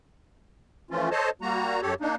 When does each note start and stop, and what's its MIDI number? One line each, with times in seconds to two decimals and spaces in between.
0.91 1.09 52
0.91 1.09 53
0.91 1.09 57
0.91 1.09 61
0.91 1.09 65
1.11 1.30 69
1.11 1.30 72
1.11 1.30 73
1.11 1.30 75
1.11 1.30 81
1.42 1.81 55
1.42 1.81 58
1.42 1.81 66
1.42 1.81 82
1.82 1.94 42
1.82 1.94 67
1.82 1.94 69
1.82 1.94 73
2.01 2.15 58
2.01 2.15 62
2.01 2.15 63